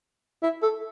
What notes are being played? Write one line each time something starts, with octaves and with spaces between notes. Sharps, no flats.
E4
A4